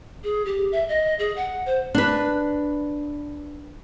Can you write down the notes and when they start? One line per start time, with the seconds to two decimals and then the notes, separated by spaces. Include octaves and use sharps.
0.24 G#4
0.46 G4
0.72 E5
0.89 D#5
1.19 G#4
1.36 F#5
1.66 C5
1.95 D4 B4